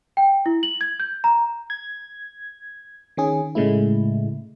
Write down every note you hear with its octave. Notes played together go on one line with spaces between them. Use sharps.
G5
E4
F#7
G#6
G6
A#5
G#6
D#3 C#4 G#4
A2 C#3 G#3 A3 E4